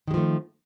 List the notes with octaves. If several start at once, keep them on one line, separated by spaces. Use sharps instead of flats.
D#3 F3 G#3 A3